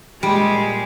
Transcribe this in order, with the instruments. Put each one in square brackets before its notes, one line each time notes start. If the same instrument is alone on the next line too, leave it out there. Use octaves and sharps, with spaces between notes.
[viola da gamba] A#2 G#3 [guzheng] G3